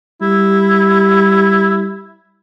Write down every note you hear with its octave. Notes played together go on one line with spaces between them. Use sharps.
G3 E4